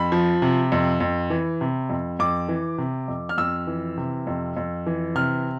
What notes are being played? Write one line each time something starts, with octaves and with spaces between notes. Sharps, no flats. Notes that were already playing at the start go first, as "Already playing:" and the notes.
Already playing: F2 B5
F3
C3
F2
F2
E3
C3
F2
F2 D6
E3
C3
F2
F6
F2 E6
E3
C3
F2
F2
E3
C3 F6